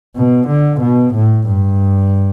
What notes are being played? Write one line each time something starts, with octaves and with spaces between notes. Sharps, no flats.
B2
D3
B2
A2
G2